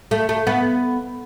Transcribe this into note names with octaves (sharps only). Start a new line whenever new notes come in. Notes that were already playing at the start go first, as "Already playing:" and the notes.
A3
A3
B3